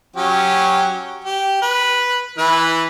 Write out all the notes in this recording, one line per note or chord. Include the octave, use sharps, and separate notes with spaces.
F#3 C#4 G4
G4
B4
E3 E4 B4